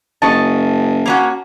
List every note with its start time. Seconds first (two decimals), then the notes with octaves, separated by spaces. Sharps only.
0.22 F#1 D#5 A5 C#6
1.06 A#3 C#4 F#4